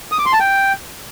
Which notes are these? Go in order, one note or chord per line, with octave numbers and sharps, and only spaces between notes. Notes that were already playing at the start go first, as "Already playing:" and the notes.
D#6
D6
C6
A5
G5